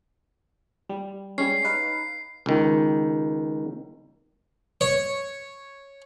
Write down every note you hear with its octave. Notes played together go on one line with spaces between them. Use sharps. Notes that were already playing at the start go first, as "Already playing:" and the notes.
G3
G3 G#3 C#4 C7
D#4 B4 F5
C#2 D#3
C#5